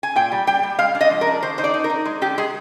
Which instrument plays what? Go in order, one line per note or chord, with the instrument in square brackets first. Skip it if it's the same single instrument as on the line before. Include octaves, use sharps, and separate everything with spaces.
[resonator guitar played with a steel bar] G#5
A#2 G5
G3
G3 G5
G3
G#3 F5
D4
D#5
F3
A#4
D4
D#3 C5
D#4 C5
D5
D#4
A#4
D#4
G#3
D3 G4
G#3 G#4